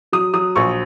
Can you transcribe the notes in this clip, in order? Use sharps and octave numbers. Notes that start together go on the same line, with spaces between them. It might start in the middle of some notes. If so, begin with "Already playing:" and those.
F#3 D#6
F#3 D#6
A#1 C#6